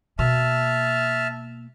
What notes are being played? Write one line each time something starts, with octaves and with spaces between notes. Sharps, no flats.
B2 A#3 E5 A5 F6